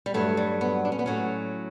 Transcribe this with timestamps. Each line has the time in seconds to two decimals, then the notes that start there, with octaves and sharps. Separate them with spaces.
0.06 G3
0.14 G2 F#3 A3
0.37 G3
0.61 B3
0.85 D4
0.92 C#4
0.99 B3
1.06 A2 F#3 C#4